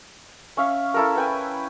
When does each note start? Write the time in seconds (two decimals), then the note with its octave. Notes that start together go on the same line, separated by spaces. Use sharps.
0.57 C#4 E5 F5
0.94 E4 A4 A#4
1.16 B4 G5 G#5